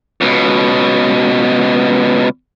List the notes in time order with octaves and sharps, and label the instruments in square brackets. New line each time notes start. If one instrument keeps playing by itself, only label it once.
[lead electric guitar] C#2 B2